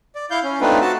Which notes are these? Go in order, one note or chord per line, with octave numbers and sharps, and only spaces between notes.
D5
E4 F5 G6
C#4
A3 C4 D4 D#4 F4 B4
F#4 A5